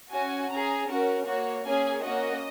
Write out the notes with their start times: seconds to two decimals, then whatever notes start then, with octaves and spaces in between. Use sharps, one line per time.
0.12 C#4 F#4 G#5
0.51 C#4 G#4 A#5
0.88 C#4 F#4 A#4
1.27 A#3 F#4 C#5
1.65 A#3 C#4 G#4 G#5
2.04 A#3 C#4 F#4 D#5